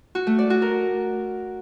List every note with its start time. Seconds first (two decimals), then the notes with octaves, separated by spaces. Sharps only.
0.15 F#4
0.27 A3
0.38 D5
0.50 F#4
0.62 A#4